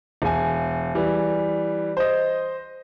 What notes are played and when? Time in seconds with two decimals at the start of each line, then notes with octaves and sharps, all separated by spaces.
0.22 E1 G#5
0.95 E3 G3
1.97 C5 D#5